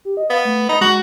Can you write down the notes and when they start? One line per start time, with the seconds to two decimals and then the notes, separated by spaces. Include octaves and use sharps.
0.05 G4
0.17 D#5
0.30 B3 F5
0.45 A3
0.69 D#4 B5
0.81 G#3 F#4